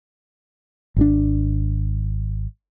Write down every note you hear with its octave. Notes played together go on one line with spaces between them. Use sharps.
G#1 D#3 D4